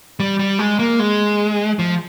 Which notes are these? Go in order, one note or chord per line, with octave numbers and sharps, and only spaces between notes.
G3
G3
G#3
A#3
G#3
F3